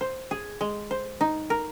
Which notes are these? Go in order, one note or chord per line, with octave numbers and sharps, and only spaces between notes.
C5
G#4
G#3
C5
D#4
A#4